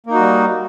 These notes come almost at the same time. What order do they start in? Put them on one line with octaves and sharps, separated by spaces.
A#3 D#4 F#4 G3